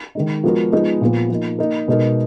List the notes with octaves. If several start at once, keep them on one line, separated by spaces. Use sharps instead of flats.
D#3 G#3 D#4
F3 G#3 B3 F#4 A#4
F3 G#3 B3 D#4
A#2 F3 B3
F3 A#3 D#4
A#3 D#4 A#4
B2 G#3 D#4 A#4